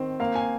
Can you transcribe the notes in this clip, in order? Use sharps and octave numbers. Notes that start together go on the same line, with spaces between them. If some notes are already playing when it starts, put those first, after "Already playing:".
Already playing: D#3 C4
A#3 F5
G#5